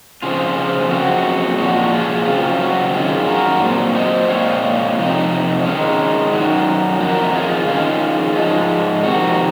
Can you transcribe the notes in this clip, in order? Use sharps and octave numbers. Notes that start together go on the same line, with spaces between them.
C#3 F3 C4 F4 G#4
F2 C#3 F#3 C4 F#4
A#2 F3 G#3 F#4
F#4
F4 G#4
C#3 F#3 C4 F4
F#4
F#2 D#3 G#3 F4 G#4
F#4 A#4
A#2 F#3 C4
C5 D#5
A#2 G#3 C4 C#5 F5
F2 C3 D#4
D#3 G#3 C#4
F#2 D#3 F#3
F2 D#3 A#3 F#4 A#4
F#4
F4 G#4
D#3 G#3 C#4 F4 G#4
G#2 F3 G#3
F2 C3 D#3 F#4